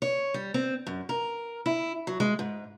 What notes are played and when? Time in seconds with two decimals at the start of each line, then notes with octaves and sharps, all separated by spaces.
0.02 C#5
0.34 G3
0.54 C4
0.87 F#2
1.09 A#4
1.66 E4
2.07 F#3
2.20 G#3
2.39 G#2